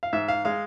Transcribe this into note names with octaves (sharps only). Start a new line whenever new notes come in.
F5
G#2 E5
F5
G#3 F5